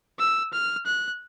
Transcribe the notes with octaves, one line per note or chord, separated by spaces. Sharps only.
E6
F6
F#6